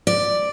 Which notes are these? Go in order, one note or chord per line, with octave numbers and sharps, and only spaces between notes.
D5